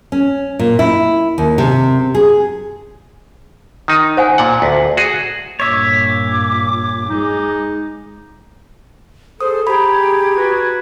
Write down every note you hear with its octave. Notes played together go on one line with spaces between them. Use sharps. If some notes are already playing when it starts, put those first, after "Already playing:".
C#4
A#2
E4
D#2
C3
G#4
D#3 D#4
C5 F#5 G#5
A#2 F#5 A5
D2
F#4 G#4
G2 A#2 C#5 E5 D6
G#3 D#4
G#4 A4 C5 D#6
G4 G#4 A#5 B5 G#6
F#4 B4